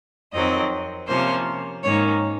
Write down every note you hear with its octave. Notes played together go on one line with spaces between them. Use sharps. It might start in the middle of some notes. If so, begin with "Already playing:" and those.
F2 D#3 F#3 C4 D#5
C3 F3 A#3 C#4 C5
G#2 D#3 A#3 C#4 C#5